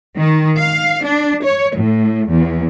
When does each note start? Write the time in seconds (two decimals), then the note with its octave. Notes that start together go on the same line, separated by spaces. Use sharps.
0.16 D#3
0.58 F5
1.04 D4
1.44 C#5
1.76 A2
2.30 E2